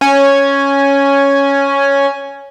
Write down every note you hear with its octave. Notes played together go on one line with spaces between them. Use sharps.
C#4 G#5